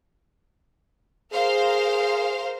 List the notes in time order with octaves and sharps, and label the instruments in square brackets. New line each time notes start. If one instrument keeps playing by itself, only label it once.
[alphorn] G#4 [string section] A#4 C5 F5